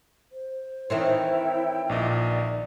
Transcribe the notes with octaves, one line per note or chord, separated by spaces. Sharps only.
C5
D#3 E3 C4 E4 C#5 G5
A#1 A#2 D5 D#5